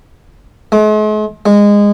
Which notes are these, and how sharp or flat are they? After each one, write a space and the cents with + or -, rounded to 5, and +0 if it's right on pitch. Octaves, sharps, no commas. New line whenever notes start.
G#3 +45
G#3 -20